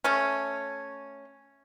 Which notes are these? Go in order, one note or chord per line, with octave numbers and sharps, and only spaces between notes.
A3 C#4